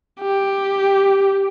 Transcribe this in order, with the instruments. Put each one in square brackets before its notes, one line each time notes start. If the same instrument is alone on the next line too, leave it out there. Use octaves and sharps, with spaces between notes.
[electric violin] G4